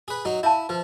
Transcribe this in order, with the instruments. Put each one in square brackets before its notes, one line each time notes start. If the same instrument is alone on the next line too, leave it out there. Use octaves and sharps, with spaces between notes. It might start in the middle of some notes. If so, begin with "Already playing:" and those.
[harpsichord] G#4 B4
F#3 D#4
[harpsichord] E4 [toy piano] E5 F5 A5
[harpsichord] F3 [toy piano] B4